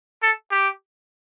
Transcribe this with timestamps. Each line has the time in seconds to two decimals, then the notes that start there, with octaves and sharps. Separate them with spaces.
0.22 A4
0.51 G4